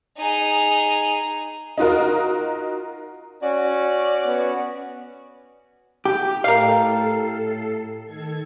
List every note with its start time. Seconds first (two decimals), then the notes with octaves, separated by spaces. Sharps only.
0.18 D#4 G#4
1.78 D#4 F4 F#4 A#4
3.42 C#4 F#4 D5
4.27 B3
6.05 G4
6.44 A2 A4 A#4 F5 C7
8.05 D#3 A4 G#6